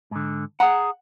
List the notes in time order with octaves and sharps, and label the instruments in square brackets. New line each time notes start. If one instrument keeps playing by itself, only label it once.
[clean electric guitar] G#2 D3
[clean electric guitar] G#4 A#5 [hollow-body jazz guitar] F#5